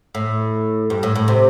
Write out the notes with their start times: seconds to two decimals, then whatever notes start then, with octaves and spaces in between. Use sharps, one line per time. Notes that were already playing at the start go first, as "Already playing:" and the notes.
0.15 A2
0.90 G2
1.03 A2
1.15 A2
1.28 C3